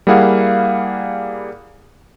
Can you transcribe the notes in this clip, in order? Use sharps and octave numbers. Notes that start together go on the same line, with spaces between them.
G3 A#3 E4 G#4 F5 F#5